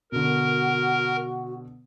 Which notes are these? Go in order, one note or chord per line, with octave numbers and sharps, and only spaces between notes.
B2 D3 F#4 A#4